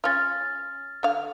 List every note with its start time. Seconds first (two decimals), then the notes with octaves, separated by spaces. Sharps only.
0.04 C#4 F4 F6 A6
1.03 D3 F5